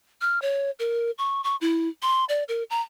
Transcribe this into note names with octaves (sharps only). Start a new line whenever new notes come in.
F6
C#5
A#4
C#6
C#6
E4
C6
D5
A#4
A#5